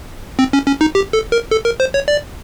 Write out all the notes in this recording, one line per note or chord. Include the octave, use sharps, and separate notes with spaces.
C4
C#4
C#4
D#4
G4
A4
A#4
A4
A#4
C5
C#5
D5